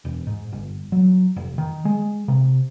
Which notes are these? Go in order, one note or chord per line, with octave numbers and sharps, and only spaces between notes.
E1
G#2
G1
F#3
F1
D#3
G#3
C3